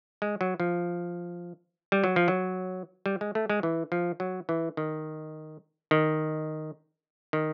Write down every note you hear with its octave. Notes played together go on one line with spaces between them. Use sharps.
G#3
F#3
F3
G3
F#3
F3
F#3
G3
G#3
A3
G#3
E3
F3
F#3
E3
D#3
D#3
D#3